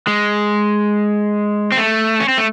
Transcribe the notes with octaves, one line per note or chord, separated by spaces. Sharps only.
G#3
C4
A3
C#4
C4
A3